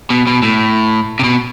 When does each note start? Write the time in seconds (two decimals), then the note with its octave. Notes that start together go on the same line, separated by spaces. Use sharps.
0.10 B2
0.27 B2
0.43 A2
1.20 C3
1.24 B2